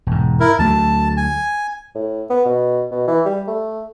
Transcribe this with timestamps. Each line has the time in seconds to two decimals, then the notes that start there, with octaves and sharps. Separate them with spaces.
0.07 E1 G#2
0.40 E4 A#4
0.59 D2 F#3 A3 A5
1.17 G#5
1.95 A2
2.30 B3
2.45 B2
2.91 B2
3.07 E3
3.25 G3
3.47 A3